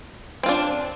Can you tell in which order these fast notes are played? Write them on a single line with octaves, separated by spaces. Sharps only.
C4 F4 D4